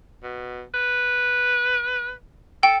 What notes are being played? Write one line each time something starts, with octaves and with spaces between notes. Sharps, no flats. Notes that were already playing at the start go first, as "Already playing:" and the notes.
B2
B4
A4 G5